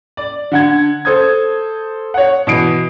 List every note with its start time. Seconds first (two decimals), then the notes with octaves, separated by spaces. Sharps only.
0.17 D5
0.52 D3 F#5 G#6
1.05 A4 C5 D#6 G#6
2.14 C#5 F#5
2.47 B2 E3 D#6 C7 D7